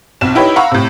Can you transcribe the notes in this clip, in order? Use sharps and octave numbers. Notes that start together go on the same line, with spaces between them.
B1 F2 E7
D#4 E4 G4 B4 C#5
F5 F#5 A#5 B5 C#6 E6
A2 C3